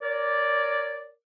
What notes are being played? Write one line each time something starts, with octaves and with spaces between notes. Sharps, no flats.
A#4 C#5 D5